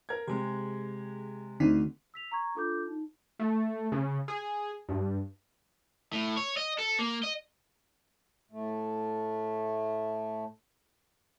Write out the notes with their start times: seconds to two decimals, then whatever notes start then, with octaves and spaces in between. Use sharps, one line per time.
0.09 A#4 G#6
0.27 C3 G#3 G#4
1.60 D2 D3 C4 D#4 B6
2.14 E6 B6 F7
2.32 A#5 C#6 G#6
2.55 D4 F4 A4 D6 G6
2.87 D#4
3.39 A3
3.92 C#3
4.28 G#4
4.89 G2
6.12 A2
6.37 C#5
6.57 D#5
6.79 A4
6.99 A#3
7.24 D#5
8.51 A2 A3